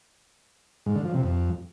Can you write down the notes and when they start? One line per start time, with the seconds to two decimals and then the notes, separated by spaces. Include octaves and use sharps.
0.86 G#2
0.96 D3
1.05 F3
1.14 C3
1.23 F2